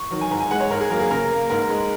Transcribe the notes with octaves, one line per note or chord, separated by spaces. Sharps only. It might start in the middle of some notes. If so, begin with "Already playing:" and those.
Already playing: C#6
D#3 F#3
G#5
G#2 A#5
G#5
G#3 F#5
C#5
G#2 A#4
G#4
F#3 A#3 A#4
G#4
C#3 A#4
A#3
G#2 A#4
G#3